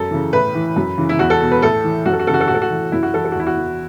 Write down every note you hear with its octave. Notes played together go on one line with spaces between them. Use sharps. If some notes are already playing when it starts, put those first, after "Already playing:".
Already playing: F#2 A4
C#3 E3
A2 B4
E3
F#2
C#3 E3
E4
E2 F#4
A4
B2
B4
A2 A4
E3
F#2 F#4
A4
F#4
C#3 E3 A4
F#4
A4
A2 F#4
A4
F#4
E3
F#2 E4
F#4
E3 A4
A4
F#4
E2 E4
F#4
E3